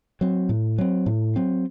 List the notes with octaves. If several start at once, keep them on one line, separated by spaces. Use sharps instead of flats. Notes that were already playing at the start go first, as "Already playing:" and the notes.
F#3 C4
A2
F#3 C4
A2
F#3 C4